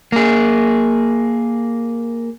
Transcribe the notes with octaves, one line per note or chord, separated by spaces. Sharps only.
A#3 G#4